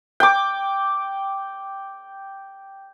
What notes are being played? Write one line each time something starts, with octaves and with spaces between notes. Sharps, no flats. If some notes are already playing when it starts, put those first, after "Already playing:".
G5 D6